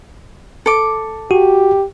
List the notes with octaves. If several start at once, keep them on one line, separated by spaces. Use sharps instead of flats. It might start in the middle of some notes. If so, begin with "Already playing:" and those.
A4 D6
F#4 G4